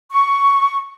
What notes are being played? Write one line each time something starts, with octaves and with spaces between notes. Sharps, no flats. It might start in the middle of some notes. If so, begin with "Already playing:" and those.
C#6